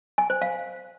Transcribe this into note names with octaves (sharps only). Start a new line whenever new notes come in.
G#5
C5
F5